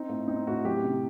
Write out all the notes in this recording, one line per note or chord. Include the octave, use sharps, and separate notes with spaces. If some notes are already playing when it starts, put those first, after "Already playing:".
Already playing: C4 D#4
A2
C4 D#4
A2 F#4
F#3 G4
C3